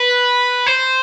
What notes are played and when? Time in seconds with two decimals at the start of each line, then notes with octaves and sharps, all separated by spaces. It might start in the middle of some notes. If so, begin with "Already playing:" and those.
Already playing: B4
0.67 C5